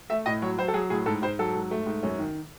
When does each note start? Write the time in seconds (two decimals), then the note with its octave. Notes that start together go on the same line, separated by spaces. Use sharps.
0.10 A3 E5
0.26 A2 D#5
0.42 F#3 C#5
0.58 F#3 C5
0.68 A4
0.73 F#3 G#4
0.90 A2 G#4
1.06 G#2 A4
1.22 G#2 C5
1.39 F#3 A4
1.54 G#2
1.71 A3
1.86 G#2
2.03 F#2 C#4
2.19 D#3